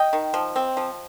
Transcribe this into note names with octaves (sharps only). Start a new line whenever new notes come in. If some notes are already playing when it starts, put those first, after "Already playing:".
Already playing: D#5 G5
D#3
F3
C4
F3